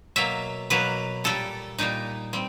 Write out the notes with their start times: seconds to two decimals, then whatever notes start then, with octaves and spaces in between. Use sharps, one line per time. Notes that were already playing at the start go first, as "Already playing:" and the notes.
0.16 B2 F#3 A#3 E5
0.70 B2 F#3 A#3 B4
1.24 A#2 G3 A#3 A4
1.78 A#2 G3 A#3 D#4
2.33 G3 C4